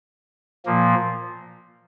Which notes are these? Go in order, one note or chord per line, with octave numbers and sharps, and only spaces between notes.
A#2 F3 A#3